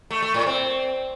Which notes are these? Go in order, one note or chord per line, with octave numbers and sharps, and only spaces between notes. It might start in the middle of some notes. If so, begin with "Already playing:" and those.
A3
A3
A2
C4